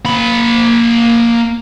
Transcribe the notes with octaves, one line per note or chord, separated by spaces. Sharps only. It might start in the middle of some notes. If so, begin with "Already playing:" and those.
A#3 B5